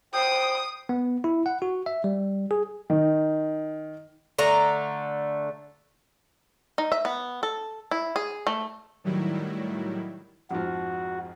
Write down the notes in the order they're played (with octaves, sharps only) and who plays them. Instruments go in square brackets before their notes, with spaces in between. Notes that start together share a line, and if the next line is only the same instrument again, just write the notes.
[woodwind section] C5 G5 [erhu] D#6
[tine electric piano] B3
E4
F#5
F#4
E5
G3
G#4
[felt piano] D#3
[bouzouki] D3 A3 A#5
[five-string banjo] D#4
E5
B3
A4
E4
G#4
A3
[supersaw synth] A2 D#3 F#3 G3 E4
[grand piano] F2 G#2 F3 [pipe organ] F#4